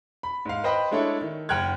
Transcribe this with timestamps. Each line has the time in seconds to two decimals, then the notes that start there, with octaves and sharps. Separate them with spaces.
0.23 B5
0.45 G#2 F5
0.64 B4 C5 D#5 G5 B5
0.91 G#3 A3 D4 E4 A4 C#5
1.21 D#3
1.49 F#1 F#5 G5 F6 F#6 G#6